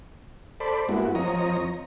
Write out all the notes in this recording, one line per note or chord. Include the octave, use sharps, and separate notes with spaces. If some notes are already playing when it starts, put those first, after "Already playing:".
A4 C5 D5 B5
G2 G#3 A#3 B3 E4 F#4
F2 F3 C4 C#5 D#5 A#5